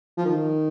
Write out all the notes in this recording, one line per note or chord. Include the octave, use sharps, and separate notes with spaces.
F3
D#3